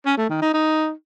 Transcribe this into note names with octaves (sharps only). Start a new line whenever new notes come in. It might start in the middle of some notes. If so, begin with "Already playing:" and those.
C#4
A3
D#3
D#4
D#4